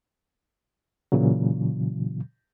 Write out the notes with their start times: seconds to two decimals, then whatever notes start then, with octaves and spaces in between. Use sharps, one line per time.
1.12 A#2 C#3 E3 F#3